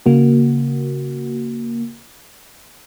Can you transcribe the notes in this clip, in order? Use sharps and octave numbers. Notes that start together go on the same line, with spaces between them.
C#3 A#3 F#4